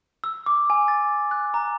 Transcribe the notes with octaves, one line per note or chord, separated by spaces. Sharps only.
E6
D6
G#5
A6
F#6
A#5